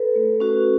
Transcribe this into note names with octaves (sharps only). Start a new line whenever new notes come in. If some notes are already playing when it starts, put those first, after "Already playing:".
Already playing: A4 B4
A3
C#4 F#4